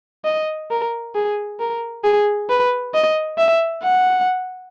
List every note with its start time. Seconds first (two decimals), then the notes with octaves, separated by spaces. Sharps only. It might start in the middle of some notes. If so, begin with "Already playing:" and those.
0.25 D#5
0.71 A#4
1.15 G#4
1.60 A#4
2.04 G#4
2.50 B4
2.94 D#5
3.38 E5
3.84 F#5